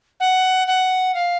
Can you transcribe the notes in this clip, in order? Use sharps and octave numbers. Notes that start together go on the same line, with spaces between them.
F#5
F#5
F5